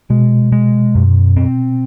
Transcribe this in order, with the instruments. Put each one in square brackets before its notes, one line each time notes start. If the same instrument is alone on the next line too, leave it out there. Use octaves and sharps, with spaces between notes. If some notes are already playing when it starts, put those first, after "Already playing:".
[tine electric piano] B2 [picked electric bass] G#3
[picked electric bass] G#3
F#2
C4